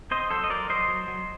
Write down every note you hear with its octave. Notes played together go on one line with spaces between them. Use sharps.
C4 C5 D#5
F#3 A4 C5
D#5
F#3 A#4 D5
F#3 C5 D#5
F#3
F#3